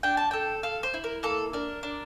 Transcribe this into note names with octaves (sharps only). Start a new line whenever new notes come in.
D4 G5
A5
A4 G5
A4 F5
C5
E4
A#4
A#3 A4
D4 A#4
D4